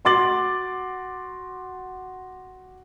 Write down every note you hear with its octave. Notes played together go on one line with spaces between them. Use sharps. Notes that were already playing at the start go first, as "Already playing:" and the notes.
F#4 C6 D6 A6 F#7